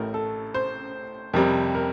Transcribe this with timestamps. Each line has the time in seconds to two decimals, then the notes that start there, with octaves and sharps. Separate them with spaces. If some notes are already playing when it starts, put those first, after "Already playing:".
Already playing: A1 A2 A3 A#4
0.14 A4
0.54 C5
1.34 F2 C3 G3 A#4
1.75 A#4